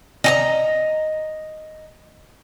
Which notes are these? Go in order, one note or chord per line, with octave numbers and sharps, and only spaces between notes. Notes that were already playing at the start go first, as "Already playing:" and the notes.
D#5 G#5 A#5